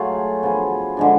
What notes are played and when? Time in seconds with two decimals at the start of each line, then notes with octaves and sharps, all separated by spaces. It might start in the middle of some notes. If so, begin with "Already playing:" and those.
Already playing: F#3 A3 F4 G#4
0.43 F3 B3 F4 G#4
0.97 D3 F3 G#3 D4